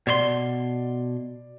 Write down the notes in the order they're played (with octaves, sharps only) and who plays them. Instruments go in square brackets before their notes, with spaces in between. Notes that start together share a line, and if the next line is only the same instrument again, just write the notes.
[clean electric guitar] B2 C#5 C6 [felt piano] D5